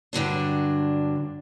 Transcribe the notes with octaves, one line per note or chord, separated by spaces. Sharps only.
G2 D3 F#3 D4